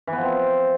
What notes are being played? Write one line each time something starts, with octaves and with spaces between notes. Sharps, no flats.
E3
B3
F3
C4